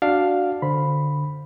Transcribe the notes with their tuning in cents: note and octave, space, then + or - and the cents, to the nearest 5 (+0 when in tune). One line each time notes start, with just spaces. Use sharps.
D4 +0 F#4 +0 F5 +0
D3 +0 C5 +0 B5 +0